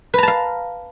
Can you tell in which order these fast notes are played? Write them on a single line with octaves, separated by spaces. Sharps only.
B4 A#5 A5 F5